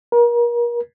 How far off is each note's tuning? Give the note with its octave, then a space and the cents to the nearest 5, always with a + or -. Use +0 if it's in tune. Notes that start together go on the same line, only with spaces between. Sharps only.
A#4 +35